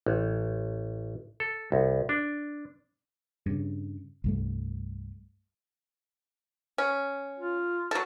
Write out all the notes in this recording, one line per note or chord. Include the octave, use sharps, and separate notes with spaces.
A1
A4
C2
D4
G2 C#3
C2 G2 A3
C#4
F4
F#3 A4